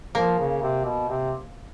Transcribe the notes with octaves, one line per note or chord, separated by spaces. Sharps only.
F3 A#3
C#3
C3
B2
C3